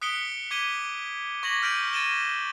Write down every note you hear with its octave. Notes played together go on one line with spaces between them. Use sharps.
D#6 F#6 B6 C#7 D7 G7
D6 G#6 B6 D#7 G7
C#6 D6 G#6 A#6 B6 F#7
F6 G6 B6 D7 D#7 F#7
F6 A6 D#7 E7 G7